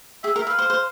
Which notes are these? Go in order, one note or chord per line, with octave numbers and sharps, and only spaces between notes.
G#4 E5
A#4
E5
B4 F5
C5
C5